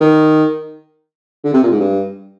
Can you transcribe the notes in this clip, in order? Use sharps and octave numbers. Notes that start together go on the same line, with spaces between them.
D#3
D3
C3
A#2
G#2
G2